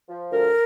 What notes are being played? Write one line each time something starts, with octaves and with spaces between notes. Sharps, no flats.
F3
D2 A#4